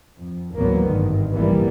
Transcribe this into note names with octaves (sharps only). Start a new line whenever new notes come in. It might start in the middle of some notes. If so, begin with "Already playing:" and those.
F2
A1 D2 F#3 A#3 B3
G#1 G2 D3 D#3
F1 A#1 E3 G3 A#3 B3